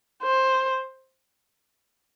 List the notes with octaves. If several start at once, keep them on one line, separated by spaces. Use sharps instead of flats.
C5